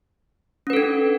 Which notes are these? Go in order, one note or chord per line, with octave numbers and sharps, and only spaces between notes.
C#4 D4 A4 B4